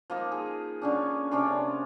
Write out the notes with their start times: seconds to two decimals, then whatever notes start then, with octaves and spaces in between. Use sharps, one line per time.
0.10 F3 A#3 D#4
0.32 G#4
0.82 D3 C#4 D4
1.31 C3 C#4 D4 C6